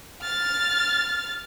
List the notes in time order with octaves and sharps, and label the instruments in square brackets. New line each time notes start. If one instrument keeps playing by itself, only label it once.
[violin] F6 A6